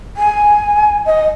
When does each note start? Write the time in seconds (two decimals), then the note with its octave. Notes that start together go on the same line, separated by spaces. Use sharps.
0.17 G#5
1.06 D#5